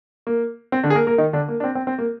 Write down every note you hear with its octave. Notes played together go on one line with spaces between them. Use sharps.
A#3
C4
D3 D4
G#4
A#3 A#4
A#3 A#4
D#3 D#4
D3 D4
A#3
D4
C4
C4
C4
A#3